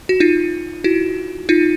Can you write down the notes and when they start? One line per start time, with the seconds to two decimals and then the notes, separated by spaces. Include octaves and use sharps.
0.09 F#4
0.20 D#4 F4
0.84 E4 F#4
1.49 D#4 F4